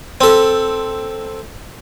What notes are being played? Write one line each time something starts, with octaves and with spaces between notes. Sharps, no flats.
C4 A4